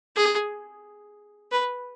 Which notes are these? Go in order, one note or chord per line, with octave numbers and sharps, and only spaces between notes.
G#4
B4